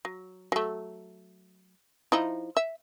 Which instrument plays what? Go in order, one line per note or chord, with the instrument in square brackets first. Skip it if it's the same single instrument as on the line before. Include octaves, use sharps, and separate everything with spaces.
[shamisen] F#3
F#3 A3
F3 D#4 E4
E5